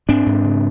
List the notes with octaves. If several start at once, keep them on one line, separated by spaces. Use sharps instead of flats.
G#2 C4 D4
G#2
C#3